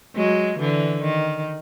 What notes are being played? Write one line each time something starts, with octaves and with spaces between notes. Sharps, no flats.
F#3 G#3
D3 E3
D#3